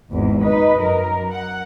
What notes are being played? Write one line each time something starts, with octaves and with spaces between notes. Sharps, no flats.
G#1 E2 G#2
D#4 B4 D#5
F#2 A#4
F#5